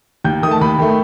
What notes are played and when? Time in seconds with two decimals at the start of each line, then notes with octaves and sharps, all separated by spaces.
0.24 D#2 G6
0.43 D#3 D#6
0.47 A3 A5
0.61 D#2 B5
0.79 D#3 A3